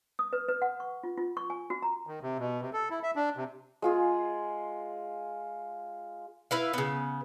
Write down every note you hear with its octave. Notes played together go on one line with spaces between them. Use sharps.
D#6
B4
B4
F#5
C#6
F4
F4
C#6
G#5
F#4
A#5
D#3
C3
B2
C3
A4
E4
E5
D4
C3
G#3 F4 G#4
E4 B4 F5
C#3 B3